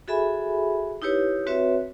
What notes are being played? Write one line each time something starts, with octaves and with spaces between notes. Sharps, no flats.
F#4 G#4 A4 E5 G#5 B5
D#4 E4 G4 B4 C#5
C4 F#4 B4 C#5 E5